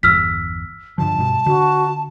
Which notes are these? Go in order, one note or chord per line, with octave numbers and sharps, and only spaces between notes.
G1 E2 E6 F6 B6
G2 D3 F3 A5
G2 B2
D3 F#4